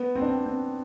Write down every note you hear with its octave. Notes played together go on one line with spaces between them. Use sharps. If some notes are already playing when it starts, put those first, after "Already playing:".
Already playing: B3
C4
D4
C4
C4